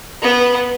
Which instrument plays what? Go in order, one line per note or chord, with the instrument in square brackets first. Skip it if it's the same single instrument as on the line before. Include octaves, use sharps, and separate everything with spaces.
[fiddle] B3